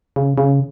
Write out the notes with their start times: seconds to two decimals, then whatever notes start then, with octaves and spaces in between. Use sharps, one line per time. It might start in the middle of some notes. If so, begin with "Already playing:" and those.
0.16 C#3
0.38 C#3